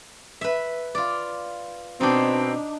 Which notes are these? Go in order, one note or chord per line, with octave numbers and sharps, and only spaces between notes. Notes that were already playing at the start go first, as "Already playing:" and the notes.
B4 E5
F4 D5
B2 C4 D4 D#4